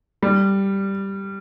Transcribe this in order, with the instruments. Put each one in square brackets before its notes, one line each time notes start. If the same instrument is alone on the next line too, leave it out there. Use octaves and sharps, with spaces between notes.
[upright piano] G3